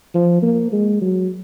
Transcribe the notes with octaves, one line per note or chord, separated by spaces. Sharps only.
F3
A#3
G#3
F#3